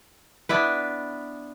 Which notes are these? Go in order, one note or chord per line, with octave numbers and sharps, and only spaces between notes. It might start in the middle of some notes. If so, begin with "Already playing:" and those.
B3 D4 E4 B4